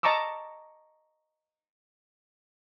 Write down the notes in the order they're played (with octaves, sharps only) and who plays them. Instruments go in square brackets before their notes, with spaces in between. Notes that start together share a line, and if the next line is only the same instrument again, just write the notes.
[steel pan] D#5 A5 A#5 C#6 D6 E6